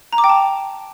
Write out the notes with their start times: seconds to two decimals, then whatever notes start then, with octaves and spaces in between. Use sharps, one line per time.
0.13 A#5
0.18 D6
0.24 G5
0.29 A5